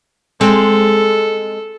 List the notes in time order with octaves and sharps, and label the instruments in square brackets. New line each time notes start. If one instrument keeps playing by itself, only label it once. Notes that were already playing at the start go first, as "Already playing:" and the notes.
[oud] G#3 C4 G#4 [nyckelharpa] A4